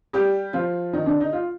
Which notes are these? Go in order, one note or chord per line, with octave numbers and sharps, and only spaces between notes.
G3 G4
F3 F4
D#3 D#4
D3 D4
D#4
F4